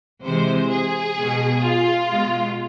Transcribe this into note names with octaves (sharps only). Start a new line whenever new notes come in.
C3 E3 G#3 C5
G#4
B2 G#3
F4
B2 G#3